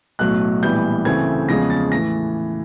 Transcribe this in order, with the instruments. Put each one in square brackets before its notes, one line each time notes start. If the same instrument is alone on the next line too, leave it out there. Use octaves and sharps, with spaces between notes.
[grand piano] B1 A2 F#3 F#6
A#1 A2 E3 G3 B3 G6
D2 C#3 E3 A3 C4 G#6
E2 C#3 F3 G#3 A#6
A6
A2 E3 A#6